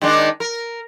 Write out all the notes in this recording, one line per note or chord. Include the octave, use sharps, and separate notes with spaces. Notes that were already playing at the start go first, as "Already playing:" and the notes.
D#3 G#3 D4
A#4